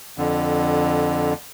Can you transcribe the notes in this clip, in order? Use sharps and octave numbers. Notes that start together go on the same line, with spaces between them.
F2 D3